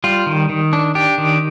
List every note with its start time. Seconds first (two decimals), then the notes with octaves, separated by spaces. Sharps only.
0.04 G3 F4
0.26 D#3
0.49 D#3
0.73 D4
0.95 D4 G4
1.18 D#3